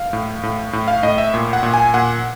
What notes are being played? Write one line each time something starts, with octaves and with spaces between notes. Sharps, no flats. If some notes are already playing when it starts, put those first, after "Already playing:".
Already playing: F5
A2
A2
A2
F5
A2 D#5
E5
A#2
F#5
A#2
G#5
A#2 F#5